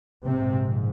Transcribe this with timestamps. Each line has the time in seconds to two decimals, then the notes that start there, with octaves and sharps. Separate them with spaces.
0.24 A#1 G#2 C3 C4